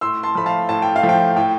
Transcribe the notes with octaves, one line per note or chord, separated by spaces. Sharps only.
A2 C6 E6
A5 C6
F3 A3 B5
F5 A5
A2 A5
G5
F5
F3 A3
G5
A2 G5